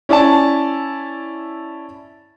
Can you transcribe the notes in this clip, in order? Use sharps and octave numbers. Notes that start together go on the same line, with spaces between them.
C#4 E4 D5 G#5 A5